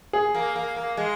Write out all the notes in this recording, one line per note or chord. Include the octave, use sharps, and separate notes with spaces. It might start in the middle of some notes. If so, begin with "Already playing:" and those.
G#4
A#3
A#3
A#3
G#3